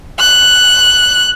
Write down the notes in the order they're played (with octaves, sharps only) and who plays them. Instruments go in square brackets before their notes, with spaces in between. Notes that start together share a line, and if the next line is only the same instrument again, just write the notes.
[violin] F#6